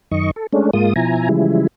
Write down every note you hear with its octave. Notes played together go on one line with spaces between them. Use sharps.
F#2 D#3 D#5 C#6
A4
G#3 A3 C#4 D4
G#2 G#3 A#3 F4 D#6
B2 F3 E4 G#5 A#5
C#3 E3 F3 G3 G#3 E4